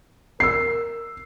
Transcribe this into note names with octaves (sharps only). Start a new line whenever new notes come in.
A#4 E6 C7